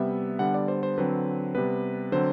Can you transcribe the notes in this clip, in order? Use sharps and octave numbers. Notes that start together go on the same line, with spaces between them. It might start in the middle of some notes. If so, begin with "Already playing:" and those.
Already playing: C3 G3 B3 E5
D3 G3 B3 F#5
D5
C5
C5
D3 F#3 C4 B4
C3 G3 B3 B4
D3 F#3 C4 C5